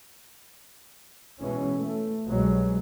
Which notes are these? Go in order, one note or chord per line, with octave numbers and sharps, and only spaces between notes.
B2 E3 G#3 C#4
A3
C2 B2 F#3 G#3